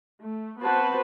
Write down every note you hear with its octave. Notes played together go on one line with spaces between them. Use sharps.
A3
B3 C4 F#4 B4 C5 A5